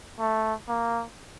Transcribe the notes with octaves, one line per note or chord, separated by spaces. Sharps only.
A3
A#3